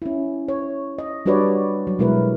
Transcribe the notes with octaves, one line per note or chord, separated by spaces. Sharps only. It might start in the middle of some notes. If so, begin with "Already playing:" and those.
C#4 E4
C#5
D#5
G3 D4 F#4 B4 C#5 D5
F#3
B2 G#3 E4 A#4 B4